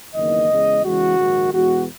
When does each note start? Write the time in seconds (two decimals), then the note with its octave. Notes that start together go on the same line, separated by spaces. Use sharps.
0.14 F#1 E2 D#3 A#3 D#5
0.49 E2 C#3 G#3
0.83 E2 C#3 E3 G#3 F#4
1.18 A#1 G#2 D#3
1.52 E2 B2 G#3 F#4